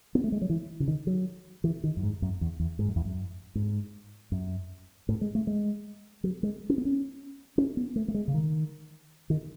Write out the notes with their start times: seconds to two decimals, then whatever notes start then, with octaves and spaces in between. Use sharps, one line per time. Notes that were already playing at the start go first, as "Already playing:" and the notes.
0.15 B3
0.24 A3
0.32 G#3
0.42 F#3
0.50 E3
0.80 C#3
0.88 D#3
1.07 F#3
1.64 E3
1.84 D#3
1.97 F#2
2.03 G#2
2.22 F#2
2.41 E2
2.60 E2
2.79 G#2
2.88 F#2
2.96 E2
3.05 F#2
3.55 G#2
4.32 F#2
5.09 A2
5.21 G#3
5.35 A3
5.47 G#3
6.24 F#3
6.43 G#3
6.69 C#4
6.78 B3
6.85 C#4
7.58 C#4
7.77 B3
7.96 A3
8.08 A3
8.14 G#3
8.28 C#3
8.34 D#3
9.30 D#3